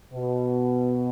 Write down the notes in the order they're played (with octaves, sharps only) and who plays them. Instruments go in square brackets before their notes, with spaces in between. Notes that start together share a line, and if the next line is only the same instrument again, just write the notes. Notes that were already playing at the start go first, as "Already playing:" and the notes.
[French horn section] B2